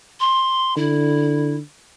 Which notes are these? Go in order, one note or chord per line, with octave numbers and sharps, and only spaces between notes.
C6
D3 E4